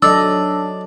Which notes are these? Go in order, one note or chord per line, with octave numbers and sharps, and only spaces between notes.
F#3 D4 A4 D5 D#5 E6